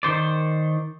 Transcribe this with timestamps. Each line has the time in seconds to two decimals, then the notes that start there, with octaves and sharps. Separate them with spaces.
0.03 D#3 C5 D5